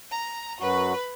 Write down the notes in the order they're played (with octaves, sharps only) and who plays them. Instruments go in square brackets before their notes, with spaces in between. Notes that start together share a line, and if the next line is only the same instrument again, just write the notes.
[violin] A#5
[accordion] F#2 F#3 F#4 [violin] B4